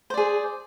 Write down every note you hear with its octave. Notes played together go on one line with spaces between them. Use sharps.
G#4 C5 D5